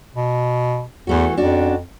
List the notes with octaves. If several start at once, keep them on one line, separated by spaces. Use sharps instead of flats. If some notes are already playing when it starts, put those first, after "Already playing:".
B2
E2 E3 A3 F#4
F2 C#4 D4 F#4